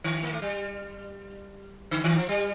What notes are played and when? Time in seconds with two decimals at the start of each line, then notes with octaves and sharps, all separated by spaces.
0.04 D#3
0.23 A#3
0.33 A3
0.42 G3
1.91 D3
2.04 D#3
2.16 F3
2.29 G3